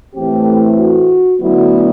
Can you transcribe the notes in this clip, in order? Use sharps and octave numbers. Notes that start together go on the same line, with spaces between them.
A2 E3 A3 C4 G4
F#4
D2 D3 F#3 B3 E4